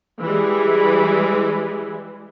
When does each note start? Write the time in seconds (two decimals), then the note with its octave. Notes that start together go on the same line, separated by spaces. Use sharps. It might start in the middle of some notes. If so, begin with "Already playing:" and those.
0.21 E3 G3 G#3